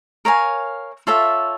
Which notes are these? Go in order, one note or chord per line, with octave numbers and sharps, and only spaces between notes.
A#4 C#5 F5 G#5
F4 A4 C#5 E5